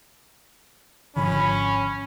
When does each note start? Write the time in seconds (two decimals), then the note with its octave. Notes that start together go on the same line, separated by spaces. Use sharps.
1.16 G#1 D3 F3 C#4 B5